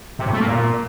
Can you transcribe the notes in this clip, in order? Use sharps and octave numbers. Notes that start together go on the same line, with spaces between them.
C3
A2
A3
A#3
A#2